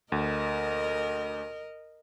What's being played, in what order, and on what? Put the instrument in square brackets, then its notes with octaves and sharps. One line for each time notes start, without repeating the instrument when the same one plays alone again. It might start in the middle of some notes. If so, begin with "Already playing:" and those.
[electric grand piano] D2 [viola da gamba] A#4 D#5